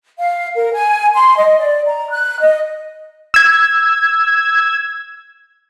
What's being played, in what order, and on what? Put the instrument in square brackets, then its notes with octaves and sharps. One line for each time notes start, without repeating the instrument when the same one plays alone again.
[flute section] F5
A#4
G#5
C6
D#5
D5
A#5
F#6
D#5
[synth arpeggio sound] E6 G#6